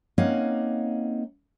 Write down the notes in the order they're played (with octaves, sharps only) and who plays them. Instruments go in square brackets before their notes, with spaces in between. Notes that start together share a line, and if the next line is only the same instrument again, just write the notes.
[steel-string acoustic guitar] A#3 C4 C#4 D#4 F5 F#5